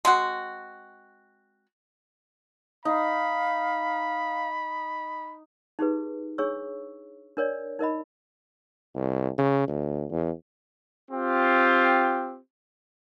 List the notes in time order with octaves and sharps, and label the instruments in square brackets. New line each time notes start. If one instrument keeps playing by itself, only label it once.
[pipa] G#3 C4 F#4
[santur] D#4 [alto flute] F5 [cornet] B5
[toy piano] D#4 G4 G#4 B4
D4 G#4 C#5 C#6 E6
D4 A#4 C#5 D5
D#4 A#4 D#5 B5
[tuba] C2
C#3
D2
E2
[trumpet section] C4 F4 G4